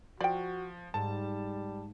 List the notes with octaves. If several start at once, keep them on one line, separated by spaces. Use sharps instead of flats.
F3 F#4 D5 G5
G#2 G3 A5